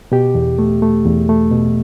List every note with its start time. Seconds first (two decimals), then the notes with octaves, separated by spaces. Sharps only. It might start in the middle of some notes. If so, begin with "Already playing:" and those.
0.12 B2 G4
0.35 E2
0.59 A3
0.82 A3
1.06 E2
1.29 A3
1.52 B2